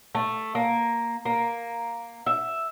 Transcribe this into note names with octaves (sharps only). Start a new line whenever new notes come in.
A3
A#3
A#3
E5